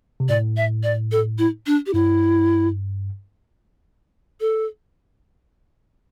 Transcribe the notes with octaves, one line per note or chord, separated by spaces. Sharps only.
C3
A2 D5
E5
D5
A4
E4
D4
G4
G2 E4
A4